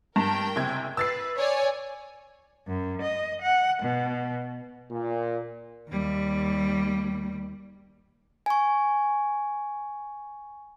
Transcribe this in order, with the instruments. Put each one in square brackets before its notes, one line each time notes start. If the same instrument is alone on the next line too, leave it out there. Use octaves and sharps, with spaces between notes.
[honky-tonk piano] G2 A5 [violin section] A#4 G5
[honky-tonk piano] F#1 C3 G#6
[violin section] B4 [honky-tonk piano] E6 A6 C7
[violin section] C#5 D5 G#5
[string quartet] F#2
D#5
F#5
B2
[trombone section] A#2
[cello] D#2 G3
[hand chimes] G#5 C#6